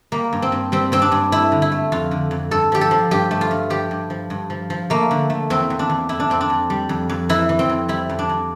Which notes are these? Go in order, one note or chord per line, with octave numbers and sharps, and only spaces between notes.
G3 A#3
G2
C4
G2
G3 C4
G2 C4
D4
G2
A3 E4
D3
E4
A3
F2 F4
D3
F2
G2 A4
F3 G4
A4
F3
G2 G4
A3
F4
G2
F3 G4
G2
F3
G2
F3
F3
A3 A#3
D3
A3
E2 C4
E2
D4
E2
F2 E4
D4
F2 C4
D4
F2
G3
F2
F2
E3 E4
E3
C4
F2
G3 E4
F2
D4
F2